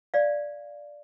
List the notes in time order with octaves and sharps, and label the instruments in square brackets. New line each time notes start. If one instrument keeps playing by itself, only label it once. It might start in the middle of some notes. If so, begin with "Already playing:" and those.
[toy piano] D5 F5